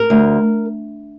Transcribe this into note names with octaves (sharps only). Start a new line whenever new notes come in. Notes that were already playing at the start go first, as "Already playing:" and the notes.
Already playing: A#4
D2